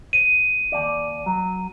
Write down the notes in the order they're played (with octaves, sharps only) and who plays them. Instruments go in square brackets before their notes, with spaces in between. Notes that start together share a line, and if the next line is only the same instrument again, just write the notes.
[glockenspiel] D#7
[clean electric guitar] D#2 D5
F#3